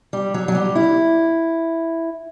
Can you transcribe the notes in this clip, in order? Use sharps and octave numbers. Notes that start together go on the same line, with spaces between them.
G3
F#3
F#3
G3
E4